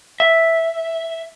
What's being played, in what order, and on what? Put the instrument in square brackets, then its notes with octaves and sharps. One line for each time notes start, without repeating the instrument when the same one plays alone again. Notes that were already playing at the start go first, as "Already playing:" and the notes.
[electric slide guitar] E5